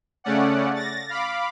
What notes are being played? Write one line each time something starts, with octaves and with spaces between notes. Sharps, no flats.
C#3 A3 C#4 D5 F#5
A6 A#6
F5 B5 D6